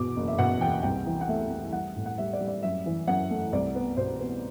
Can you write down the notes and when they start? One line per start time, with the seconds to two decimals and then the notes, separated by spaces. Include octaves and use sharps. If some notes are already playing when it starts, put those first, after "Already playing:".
Already playing: E2 B2 D6
0.16 F#1
0.28 E5
0.39 B2 F#5
0.61 E2 G5
0.83 C2 G5
1.06 E3
1.21 F#5
1.29 A3 E5
1.51 A3
1.72 G3 F#5
1.96 A2
2.06 F#5
2.18 G3 E5
2.33 D5
2.40 G3
2.48 D5
2.63 F#2 E5
2.86 E3
3.07 F#2 F#5
3.31 A3
3.52 C2 D5
3.75 B3
3.97 B2 C5
4.19 B3